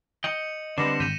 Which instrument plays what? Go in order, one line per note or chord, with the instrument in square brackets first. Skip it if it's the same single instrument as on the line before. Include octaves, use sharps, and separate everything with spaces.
[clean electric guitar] D#5 G5 [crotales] C#7 F7 F#7
[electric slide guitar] D3 G3 C4 [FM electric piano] B4 D5 [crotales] A#6 E7
[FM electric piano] G#1 G6 B6 [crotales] D#7 F7